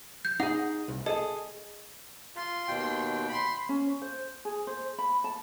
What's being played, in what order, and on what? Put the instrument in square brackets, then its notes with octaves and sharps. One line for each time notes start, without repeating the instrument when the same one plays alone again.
[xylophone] G6
[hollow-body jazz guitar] D#4 G#4 [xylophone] F#5
[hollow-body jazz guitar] C2
[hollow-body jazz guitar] G#4 A4 [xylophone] D#5
[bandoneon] F4 [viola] C6
[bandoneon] D#2 B2 G5
[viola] B5 C6
[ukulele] C#4
C5
G#4
C5
B5
A5